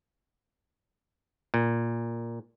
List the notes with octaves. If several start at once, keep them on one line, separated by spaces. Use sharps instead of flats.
A#2